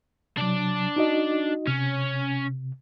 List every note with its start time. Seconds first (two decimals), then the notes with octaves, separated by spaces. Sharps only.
0.37 C3 F#3 D4 D5
0.96 D#4 F#4 D#5
1.67 C3 C#4